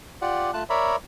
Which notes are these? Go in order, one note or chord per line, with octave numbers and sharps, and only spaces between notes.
F4 G4 D5 F#5
A3 F4 A5 F#6
A#4 C#5 D5 E5 A#5 B5